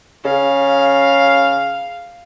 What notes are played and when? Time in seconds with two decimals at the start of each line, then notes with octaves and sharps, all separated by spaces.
0.25 C#3 F5